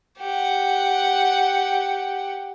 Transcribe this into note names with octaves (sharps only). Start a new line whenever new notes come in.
G4 F#5